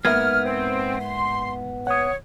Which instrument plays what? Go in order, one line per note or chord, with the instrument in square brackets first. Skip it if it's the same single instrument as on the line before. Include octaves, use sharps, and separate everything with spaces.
[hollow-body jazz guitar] G#2 A#3 B3 [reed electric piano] E5 G#6 [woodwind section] F6
[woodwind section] C4
C6
[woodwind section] C#5 [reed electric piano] F#5 D#6